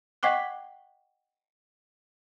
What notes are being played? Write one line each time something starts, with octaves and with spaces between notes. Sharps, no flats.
D#5 F#5 G5 C#6 D6 F#6